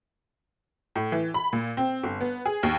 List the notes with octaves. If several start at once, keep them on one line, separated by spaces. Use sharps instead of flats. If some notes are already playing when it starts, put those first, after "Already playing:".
A2
E3
B5
A#2
C4
G1
B3
G#4
D#2